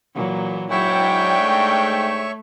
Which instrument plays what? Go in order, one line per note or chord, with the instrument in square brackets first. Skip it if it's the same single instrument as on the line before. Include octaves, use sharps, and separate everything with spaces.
[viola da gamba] A#2 E3 F#3
[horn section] G#2 D4 G5 [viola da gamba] F#3 E4 [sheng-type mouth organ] C#5 E5 C#6
[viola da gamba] A3